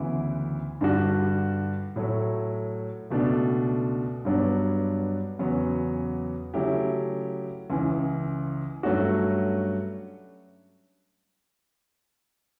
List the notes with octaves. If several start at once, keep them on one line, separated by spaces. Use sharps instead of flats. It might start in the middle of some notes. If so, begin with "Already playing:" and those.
Already playing: D2 C#3 E3 B3 E4
G2 D3 G3 D4 F#4
A2 F#3 A3
C#2 B2 A3 D4
G2 F#3 B3 D4
E2 C#3 F#3 B3
C#3 F#3 A3 E4 G4
C#2 C#3 E3
G2 F#3 A3 C#4 F#4